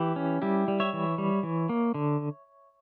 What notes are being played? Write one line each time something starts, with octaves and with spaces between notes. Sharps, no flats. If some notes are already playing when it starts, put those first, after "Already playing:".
Already playing: E3 E4 G4
C#4
G3 E4 G4
G3
C#5 E5
E3
G3
E3
A#3
D3